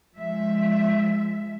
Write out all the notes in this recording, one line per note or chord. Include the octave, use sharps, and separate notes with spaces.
F3 G#3 E5